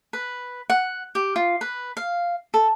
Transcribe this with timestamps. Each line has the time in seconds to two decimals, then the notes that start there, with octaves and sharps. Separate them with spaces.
0.13 B4
0.70 F#5
1.15 G4
1.36 F4
1.61 B4
1.97 F5
2.54 A4